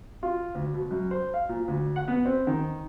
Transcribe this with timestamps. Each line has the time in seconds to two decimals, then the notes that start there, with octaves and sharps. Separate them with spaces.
0.23 F4
0.55 D2
0.74 B2
0.91 F#2
1.11 C5
1.34 F5
1.49 A#2
1.68 D2
1.96 F#5
2.08 B3
2.25 C4
2.47 D#3